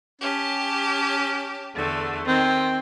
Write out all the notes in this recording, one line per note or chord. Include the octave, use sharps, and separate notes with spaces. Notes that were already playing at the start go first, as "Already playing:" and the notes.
C#4 G4 A5
E2 D3 A3
D#3 C4